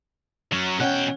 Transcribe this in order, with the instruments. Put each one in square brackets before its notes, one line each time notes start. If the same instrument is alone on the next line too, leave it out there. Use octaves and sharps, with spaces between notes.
[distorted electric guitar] F#3 C#4
[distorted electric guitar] B2 G5 [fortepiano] C#4 F#5